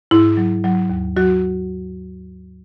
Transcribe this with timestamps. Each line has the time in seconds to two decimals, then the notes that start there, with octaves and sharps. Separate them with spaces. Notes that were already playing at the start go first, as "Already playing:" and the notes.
0.11 G#2 E4
0.37 F#3
0.64 F#3
0.90 D#2
1.17 F#3 F#4